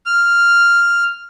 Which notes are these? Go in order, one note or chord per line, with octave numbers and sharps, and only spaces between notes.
F6